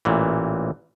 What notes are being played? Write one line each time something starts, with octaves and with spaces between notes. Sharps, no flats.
A1 A#2 E3